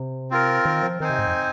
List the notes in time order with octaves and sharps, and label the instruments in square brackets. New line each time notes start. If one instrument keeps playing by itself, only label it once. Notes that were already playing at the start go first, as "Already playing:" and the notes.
Already playing: [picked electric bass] C3
[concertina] C4 F4 A#4
[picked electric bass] D#3
F3
[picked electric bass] D#3 [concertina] C4 D#4 C5 G#5
[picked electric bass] C3
G#2
F2